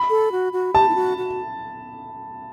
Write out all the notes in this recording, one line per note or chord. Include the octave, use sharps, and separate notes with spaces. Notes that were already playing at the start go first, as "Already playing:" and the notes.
Already playing: B5
A4
F#4
F#4
G4 A5
E4
F#4
F#4